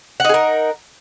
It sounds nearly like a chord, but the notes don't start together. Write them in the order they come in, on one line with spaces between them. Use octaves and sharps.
F#5 D#4 G#4 A#4